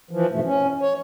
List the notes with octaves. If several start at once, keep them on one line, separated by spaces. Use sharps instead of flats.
E3 F3
F2 G#2 B2 A3
C#4
C#5